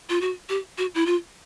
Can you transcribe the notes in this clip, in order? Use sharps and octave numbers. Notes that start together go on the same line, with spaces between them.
F4
F#4
G4
F#4
E4
F4